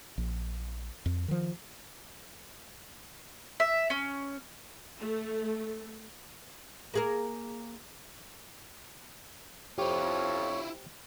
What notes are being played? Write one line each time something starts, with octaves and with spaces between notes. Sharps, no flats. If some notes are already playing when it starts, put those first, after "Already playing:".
A#1
F2
D#3 F3
E5
C#4
A3
A#3 G#4 A#4
F2 E4 F4 G4 C5 C#5